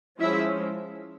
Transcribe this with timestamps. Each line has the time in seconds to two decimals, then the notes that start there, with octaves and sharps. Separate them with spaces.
0.19 F3 G#3 C#4 E4 E5